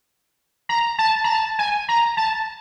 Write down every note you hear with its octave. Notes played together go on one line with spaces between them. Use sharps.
A#5
A5
A#5
A5
G#5
A#5
A5